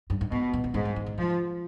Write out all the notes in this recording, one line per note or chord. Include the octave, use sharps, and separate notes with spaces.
G2
G#2
G#2 B2
B2
C3
G#2 C3
G2
D#3
D3
C3 F3